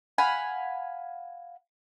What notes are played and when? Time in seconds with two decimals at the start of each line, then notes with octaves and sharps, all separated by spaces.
0.18 F5 F#5 G#5 B5